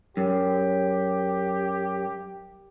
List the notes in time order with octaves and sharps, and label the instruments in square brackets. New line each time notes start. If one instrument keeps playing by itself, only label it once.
[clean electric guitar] F#2 [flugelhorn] G4